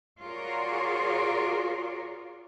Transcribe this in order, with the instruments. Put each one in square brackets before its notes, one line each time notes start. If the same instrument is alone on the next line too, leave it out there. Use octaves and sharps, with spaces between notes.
[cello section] F4 F#4 G#4 A#4 C#5 D5